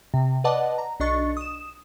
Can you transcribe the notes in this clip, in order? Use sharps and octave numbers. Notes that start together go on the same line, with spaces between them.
C3
B4 D5 D#5 F#5 A5 D6
A#5
B1 D4 D#5 C#6 A6 C#7
D#6 E7